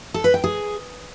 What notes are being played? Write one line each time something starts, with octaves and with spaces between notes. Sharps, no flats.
A4
B4
G5
G#4